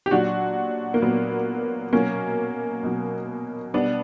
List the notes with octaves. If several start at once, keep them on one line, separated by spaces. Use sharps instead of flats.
G4
A#2 F#3 D4 F#4
A#3
A#2 F#3 B3
B2 F#3 A#3 C#4
B2 F#3
B2 G3 B3 D4